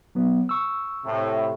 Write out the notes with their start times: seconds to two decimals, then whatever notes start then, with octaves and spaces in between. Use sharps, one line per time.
0.15 F#3 B3
0.49 C#6 E6
1.05 A2 C3